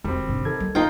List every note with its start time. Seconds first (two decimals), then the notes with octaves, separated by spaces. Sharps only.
0.04 E1 F2 D#3 G3 C4
0.28 G#1 G2 C3
0.45 D#3 A4 G#6
0.60 G3 A#3
0.75 C2 F2 D#4 F4 G5 C7